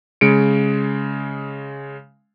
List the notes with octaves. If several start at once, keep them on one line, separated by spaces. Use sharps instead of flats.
C#3 G#3 C#7 D7